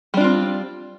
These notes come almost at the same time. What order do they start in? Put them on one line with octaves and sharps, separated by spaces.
G3 D4 F4 C4